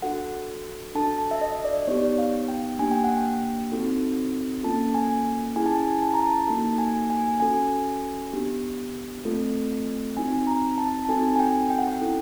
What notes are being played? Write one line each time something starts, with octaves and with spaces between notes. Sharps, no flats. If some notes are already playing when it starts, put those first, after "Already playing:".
D4 F#4 A4 F#5
D4 F#4 A4 A5
A5
E5
D#5
D5
B3 D#4 G4 C#5
D5
C#5
F5
G5
A#3 D4 G4 G#5
G5
F#5
G5
C4 D#4 F#4 A4
A#3 C#4 F4 A4 A5
G#5
C#4 E4 G#4 G#5
A5
G#5
A5
A#5
A5
A#3 D#4 F#4 A4 A5
G#5
G#5
C#4 F#4 A4 G#5
B3 D4 G4
A3 C4 F4 A4
C4 D#4 F#4 G#5
A#5
A5
A5
C4 D#4 F#4 A4 G#5
G#5
G5
G5
F#5
G5
C#4 E4 A4